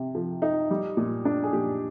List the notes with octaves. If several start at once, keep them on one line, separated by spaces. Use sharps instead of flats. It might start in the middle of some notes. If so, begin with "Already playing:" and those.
Already playing: C3
F3
D#4
G3
A#2
D4
G#4
A#2 G4